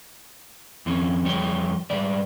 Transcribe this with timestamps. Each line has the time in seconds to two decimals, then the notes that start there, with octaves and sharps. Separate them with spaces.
0.86 F2 C4 C#4
1.24 F2 G3 C#5 G5
1.90 G#2 G3 D5